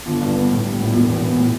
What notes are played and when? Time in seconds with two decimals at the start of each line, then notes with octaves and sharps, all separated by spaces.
0.06 G1
0.20 G2
0.35 B3
0.50 A2
0.65 G3
0.79 A2
0.94 E1
1.08 E2
1.23 B3
1.38 A2